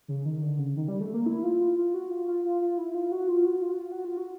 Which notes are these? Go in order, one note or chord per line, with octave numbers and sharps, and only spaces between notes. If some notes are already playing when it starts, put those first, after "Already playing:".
C#3
D#3
D3
C#3
D#3
G3
A3
A#3
E4
F4
F4
F4
F#4
F4
F4
F4
F4
E4
F4
F#4
F4
F#4
F4
F#4
F4
F#4
F4
F#4